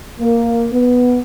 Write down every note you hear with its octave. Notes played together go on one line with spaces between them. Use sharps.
A#3
B3